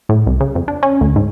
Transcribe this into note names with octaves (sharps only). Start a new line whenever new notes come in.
A2
C2
C#3
F2
D4
C#4
D2
G#2